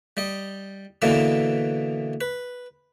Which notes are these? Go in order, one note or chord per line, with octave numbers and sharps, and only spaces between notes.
G3 D#5
B2 D3 E3 A#3 B3
B4